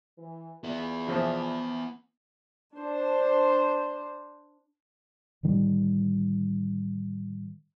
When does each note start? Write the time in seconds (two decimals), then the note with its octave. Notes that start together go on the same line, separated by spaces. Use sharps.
0.18 E3
0.64 B3 E4 F4 G#4 D5
1.07 B2 E3 F3
2.74 D4 C5
5.43 A2 D3 D#3 G3